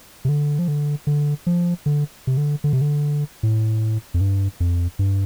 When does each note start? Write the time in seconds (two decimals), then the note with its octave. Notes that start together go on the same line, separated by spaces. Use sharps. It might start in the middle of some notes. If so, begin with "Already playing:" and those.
0.25 C3
0.29 D3
0.59 F3
0.68 D3
1.07 D3
1.47 F3
1.86 D3
2.27 C3
2.37 D3
2.64 D3
2.73 C3
2.81 D3
3.43 A2
4.14 F2
4.21 G2
4.60 F2
4.99 G2